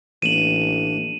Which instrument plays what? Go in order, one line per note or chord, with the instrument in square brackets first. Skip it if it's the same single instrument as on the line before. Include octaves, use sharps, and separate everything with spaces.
[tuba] A1 [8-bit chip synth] E3 A#3 D4 [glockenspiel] D#7 E7 F#7